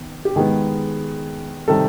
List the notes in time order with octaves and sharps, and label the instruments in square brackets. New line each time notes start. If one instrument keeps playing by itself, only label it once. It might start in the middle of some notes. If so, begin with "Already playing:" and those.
Already playing: [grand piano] D#3 B3
G4
D#3 G#3 B3 G#4
C3 D#3 G3 A4